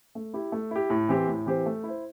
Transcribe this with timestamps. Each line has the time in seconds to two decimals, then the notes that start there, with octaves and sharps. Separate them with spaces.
0.15 A3
0.34 E4 G4
0.52 A3
0.71 E4 G4
0.90 A2
1.09 E3 C4 G4 C5
1.27 A2
1.46 E3 C4 G4 C5
1.66 A3
1.83 E4
1.88 C5